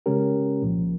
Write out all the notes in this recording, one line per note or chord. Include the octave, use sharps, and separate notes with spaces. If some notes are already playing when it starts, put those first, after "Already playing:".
C#3 G#3 C#4 G4 A#4
C2 A#2 F3